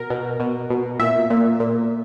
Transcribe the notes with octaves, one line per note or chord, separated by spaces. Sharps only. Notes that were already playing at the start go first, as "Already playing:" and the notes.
Already playing: B2 A#4
B2
B2
B2
A#2 E5
A#2
A#2